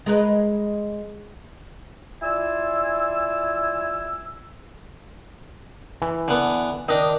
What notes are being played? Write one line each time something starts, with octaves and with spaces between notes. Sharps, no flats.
G#3 A#4 B4
E4 F4 D5 G#5 E6
E3
D3 B3
D#3 D4 D#5